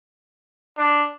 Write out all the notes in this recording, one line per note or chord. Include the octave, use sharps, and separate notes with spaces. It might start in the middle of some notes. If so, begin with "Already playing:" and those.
D4